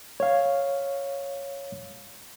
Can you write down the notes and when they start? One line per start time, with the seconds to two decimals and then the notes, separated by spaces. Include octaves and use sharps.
0.20 C#5 F5